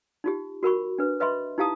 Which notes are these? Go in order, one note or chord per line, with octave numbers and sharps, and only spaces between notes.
D#4 F4 G4
F#4 A#4 B5 C#6
D4 B4
B4 D#5 E5 B5 C6
D#4 E4 G4 F5 A5 D#6